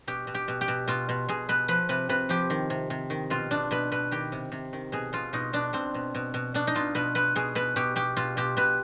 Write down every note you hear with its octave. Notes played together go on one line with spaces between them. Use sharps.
B2 G4
B2
G4
B2
G4
B2
B2 F4
B2
B2 G#4
B2 B4
F3 B4
C3 B4
C3 B4
F3 G4
D#3
C3
C3
D#3
B2 F4
B2 D4
B2 B4
B2 B4
D#3 G4
C3
C3
D#3
B2 G#4
B2 F4
B2 D#4
B2 D4
B2 C4
B2
B2
B2
B2 D4
D#4
B2 F4
B2 B4
B2 B4
B2 G#4
B2 B4
B2 G4
B2 G4
B2 F4
B2 G4
B2 B4